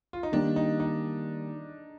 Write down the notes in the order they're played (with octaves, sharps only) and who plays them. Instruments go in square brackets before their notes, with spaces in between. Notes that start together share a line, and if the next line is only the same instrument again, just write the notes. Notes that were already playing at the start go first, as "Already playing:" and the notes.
[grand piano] F4
D#4
[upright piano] D#3 G3 A#3 [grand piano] D4
[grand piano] D#4
D#4